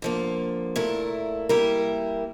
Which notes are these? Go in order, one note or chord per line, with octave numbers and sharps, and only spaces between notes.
D3 F3 A#3
A#2 A3 E4 A#4
G3 A#3 E4 A#4